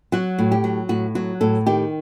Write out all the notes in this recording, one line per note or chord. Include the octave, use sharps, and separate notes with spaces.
F#3 F#4
A2
G4
F#3
A2 F#4
F#3 F#4
A2 A4
D#3 G4